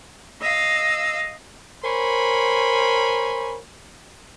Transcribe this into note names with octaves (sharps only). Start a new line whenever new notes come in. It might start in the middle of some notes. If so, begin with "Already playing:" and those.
D#5 F5 E6
A#4 C5 C#5 G#5 B5